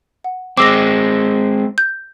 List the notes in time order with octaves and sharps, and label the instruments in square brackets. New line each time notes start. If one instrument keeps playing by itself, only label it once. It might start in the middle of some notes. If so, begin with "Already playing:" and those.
[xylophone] F#5
[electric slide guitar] G#3 C4 [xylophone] D6 E6 A#6
[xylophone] G6